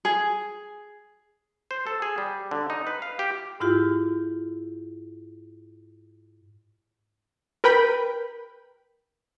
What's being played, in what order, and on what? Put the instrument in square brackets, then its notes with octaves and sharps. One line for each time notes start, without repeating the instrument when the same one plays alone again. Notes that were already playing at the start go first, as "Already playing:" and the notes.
[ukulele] G#4
[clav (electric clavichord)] C5
A4
G#4
G3
D3
D#4
B4
F5
G4
[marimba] G#2 E4 F4 G4
[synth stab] A#4 B4 G5 B5